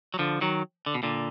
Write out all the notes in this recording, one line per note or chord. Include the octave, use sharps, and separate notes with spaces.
F#3
D3 F3
D#3 F#3
D3
B2
A#2 D3